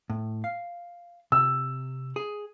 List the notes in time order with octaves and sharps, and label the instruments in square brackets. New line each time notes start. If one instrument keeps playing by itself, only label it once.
[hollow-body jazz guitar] A2
F5
[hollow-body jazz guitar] C3 [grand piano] E6
[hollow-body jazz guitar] G#4